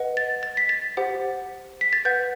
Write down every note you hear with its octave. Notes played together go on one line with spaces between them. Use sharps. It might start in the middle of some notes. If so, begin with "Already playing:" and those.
Already playing: B4 D#5 F#5
A6
A6
B6
A6
G4 C5 F#5
B6
A6
B4 F#5 G6